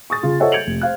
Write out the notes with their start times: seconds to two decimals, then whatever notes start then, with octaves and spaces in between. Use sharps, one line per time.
0.10 C#6 D#6 A6
0.23 C#3 F4
0.40 A4 C5 C#5 D#5 E5 F#5
0.52 G6 G#6 C#7 D7 F7 F#7
0.67 F1
0.81 C5 F5 F#6